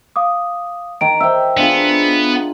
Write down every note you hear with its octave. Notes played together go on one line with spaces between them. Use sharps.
F5 D6 D#6
D#3 A#5 D7
C5 E5 G5 E6
B3 D4 F4 G#4